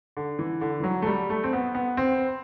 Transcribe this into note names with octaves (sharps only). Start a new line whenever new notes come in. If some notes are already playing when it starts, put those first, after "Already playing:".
D3
E3
D3
E3
F#3
A3
G3
A3
C4
B3
B3
C4